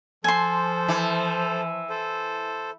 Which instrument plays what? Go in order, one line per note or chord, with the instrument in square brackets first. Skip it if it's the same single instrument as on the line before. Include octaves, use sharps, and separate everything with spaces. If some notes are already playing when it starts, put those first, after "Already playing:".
[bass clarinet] F3 [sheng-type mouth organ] A4 C5 [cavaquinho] G#5 C6
[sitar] E3
[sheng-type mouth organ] A4 C5